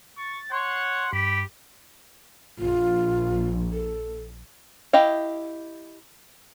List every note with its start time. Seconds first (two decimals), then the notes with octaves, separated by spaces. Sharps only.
0.18 C#6 A6
0.52 C#5 F#5 C6
1.13 G2 G4 B5
2.59 A#1 F4
3.72 A4
4.93 E4 G4 D#5 F5